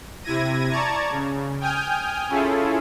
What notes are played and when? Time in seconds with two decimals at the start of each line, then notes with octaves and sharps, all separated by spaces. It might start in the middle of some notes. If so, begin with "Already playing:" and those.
0.23 C3 E4 G#6 A#6 D#7
0.70 D5 A5 A#5 C#6 G#6
1.11 C#3
1.60 G5 G#5 D#6 F6 G6
2.29 C#4 E4 F4 G#4 A4